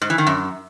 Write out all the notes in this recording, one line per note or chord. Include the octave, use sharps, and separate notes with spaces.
G#2
E3
D#3
F#2